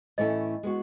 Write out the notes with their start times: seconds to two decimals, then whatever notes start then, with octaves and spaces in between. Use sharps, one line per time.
0.18 A2 E3 A3 C#4 E4 D#5
0.63 G#3 B3 F#4